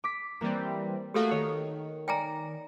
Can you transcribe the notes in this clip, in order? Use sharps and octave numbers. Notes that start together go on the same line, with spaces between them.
D6 B6
E3 G3 A#3 C4
A3 A#3 F#4 G4 A4 F5
D#3 C#5
D5 G5 G#5 A#5 A#6